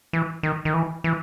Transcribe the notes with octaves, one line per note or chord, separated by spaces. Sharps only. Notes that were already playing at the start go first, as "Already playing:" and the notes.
E3
D#3
D#3
E3
E3